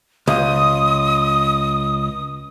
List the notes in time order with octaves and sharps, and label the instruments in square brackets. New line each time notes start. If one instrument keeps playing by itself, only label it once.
[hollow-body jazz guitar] C#2 [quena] D#6